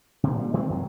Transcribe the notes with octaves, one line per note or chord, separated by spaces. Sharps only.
D1 D2 C3
A#2 G3
D#3 G#3 B3 C4
F#2 C3 F#3